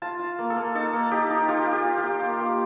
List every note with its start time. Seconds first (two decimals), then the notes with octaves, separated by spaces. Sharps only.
0.02 F4 A5
0.19 F4
0.39 A#3
0.50 A4
0.57 A#3
0.75 D#4 A4
0.93 A#3
1.11 D#4 G4
1.30 D#4
1.48 F4 G4
1.67 F4
1.73 G4
1.85 F4
1.98 G4
2.04 F4
2.22 A#3
2.40 A#3